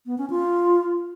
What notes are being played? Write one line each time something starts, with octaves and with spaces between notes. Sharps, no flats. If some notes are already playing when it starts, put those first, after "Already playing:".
B3
C#4
F4